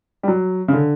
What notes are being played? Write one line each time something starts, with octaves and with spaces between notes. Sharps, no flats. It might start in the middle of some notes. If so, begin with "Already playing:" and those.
G3
F#3
C#3
D3